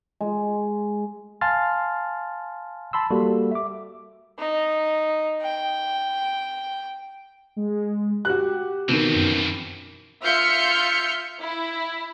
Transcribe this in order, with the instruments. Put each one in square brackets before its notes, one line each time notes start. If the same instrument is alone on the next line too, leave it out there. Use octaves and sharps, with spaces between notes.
[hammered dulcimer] G#3
[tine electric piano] F5 G#5 A5 C6 F6 A6
A5 B5 C6 E6
G3 A#3 F#4 G4 A4
E5 D6
[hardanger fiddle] D#4
G5
[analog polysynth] G#3
[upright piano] F#4 F#6 [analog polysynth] G4
[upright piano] B2 D#3 [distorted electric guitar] E3 C4
[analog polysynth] F#2
[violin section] F4 E5 F6 G6 C#7
E4